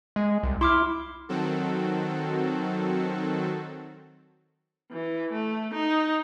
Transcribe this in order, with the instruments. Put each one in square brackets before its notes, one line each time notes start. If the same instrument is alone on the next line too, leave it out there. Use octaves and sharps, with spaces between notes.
[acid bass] G#3
C2
[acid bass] E4 [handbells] C6 D6 F6
[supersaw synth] D#3 F#3 C4 F#4 A4
[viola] E3
A3
D#4